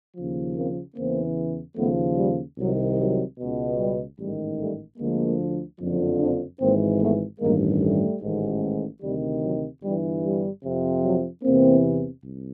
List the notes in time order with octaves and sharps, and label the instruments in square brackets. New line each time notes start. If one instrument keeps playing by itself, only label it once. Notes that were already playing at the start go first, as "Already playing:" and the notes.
[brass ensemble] D#2 C#3 F3
A#3 C4
E2 C#3 E3 A#3 C4
D#2 C#3 F3 A3 B3
G3
C2 C3 D#3 F#3
F#3
C#2 B2
G3
A1 G#2 D#3 G3
G3 A3
D2 D3 F3 G#3 A#3
F#1 F2 D3 F3
C4 D4
G#1 G#2 E3 A#3 C4
A3 B3
A1 G2 D#3 G#3 A#3
G3 A3
A1 G#2 D#3
D2 C3 D#3 G3
F#3
G1 G2 E3 G3
G3
F2 C3 F3
F#3
E2 C3 E3 A#3 C4
C2